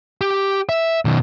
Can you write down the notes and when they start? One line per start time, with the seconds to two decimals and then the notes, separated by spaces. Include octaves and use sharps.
0.21 G4
0.69 E5
1.05 B2 D#3